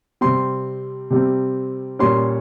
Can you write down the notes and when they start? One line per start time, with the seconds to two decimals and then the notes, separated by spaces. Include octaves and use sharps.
0.21 C3 G3 C4 C6
1.10 C3 G3 C4
1.99 A#2 G3 A#3 C#4 C6